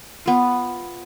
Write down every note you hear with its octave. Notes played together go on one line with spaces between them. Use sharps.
B3 F4